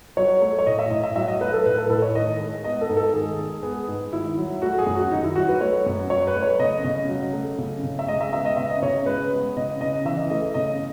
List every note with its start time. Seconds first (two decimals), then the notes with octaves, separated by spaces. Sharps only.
0.17 F#3 C#5
0.42 A3
0.59 C#5
0.66 A2 D#5
0.79 E5
0.91 A2 D#5
1.03 E5
1.16 F#3 E5
1.28 D#5
1.41 A3 B4
1.53 A4
1.66 A2 B4
1.77 A4
1.90 A2 A4
2.02 C#5
2.14 D#3 D#5
2.40 G#3
2.64 B3 D#5
2.81 A4
2.90 G#2
2.97 A4
3.13 D#3 G#4
3.38 G#3
3.63 B3 G#4
3.88 G#2
4.12 D#3 E4
4.38 F#3
4.62 A3 F#4
4.78 G#4
4.86 F#2
4.95 F#4
5.11 D#3 D#4
5.24 E4
5.36 F#3 F#4
5.49 B4
5.61 A3 C#5
5.86 F#2
6.10 F#3 C#5
6.27 B4
6.35 A3
6.43 C#5
6.59 C#3 D#5
6.84 C#3 D#5
7.09 F#3
7.33 A3
7.58 C#3
7.83 C#3
7.99 E5
8.08 G#3 D#5
8.21 E5
8.33 B3 E5
8.46 D#5
8.57 C#3 E5
8.70 D#5
8.82 C#3 C#5
9.06 G#3 B4
9.32 B3
9.57 C#3 D#5
9.80 C#3 D#5
10.05 E3 E5
10.18 D#5
10.30 A3 D#5
10.54 C#3 D#5